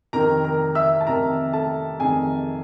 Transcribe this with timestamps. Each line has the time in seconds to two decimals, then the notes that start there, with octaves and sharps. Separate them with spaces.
0.13 F2 C3 D#3 A#4 A#5
0.44 A#4 A#5
0.75 E5 E6
1.00 A5
1.07 F2 C3 D#3 A#4 A#5
1.53 A4 A5
2.00 F2 C3 D#3 G#4 G#5